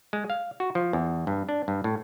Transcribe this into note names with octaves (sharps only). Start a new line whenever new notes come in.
G#3
F5
F#4
F3
E2
G2
D4
G2
A2